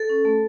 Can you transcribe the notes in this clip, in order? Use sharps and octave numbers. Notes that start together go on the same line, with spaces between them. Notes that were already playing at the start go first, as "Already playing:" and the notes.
Already playing: A4
C#4
A3